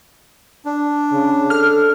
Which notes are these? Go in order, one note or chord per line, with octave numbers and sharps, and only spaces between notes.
D4
C#3
A4 F6